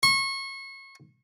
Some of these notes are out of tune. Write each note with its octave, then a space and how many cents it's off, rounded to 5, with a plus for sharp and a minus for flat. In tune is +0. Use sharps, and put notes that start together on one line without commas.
C#6 -30